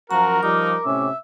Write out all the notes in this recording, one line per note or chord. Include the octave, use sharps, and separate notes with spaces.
F#2 F3 F#4 A#4 A#5
F3 G3 D#4 D6
A2 C3 C#4 E5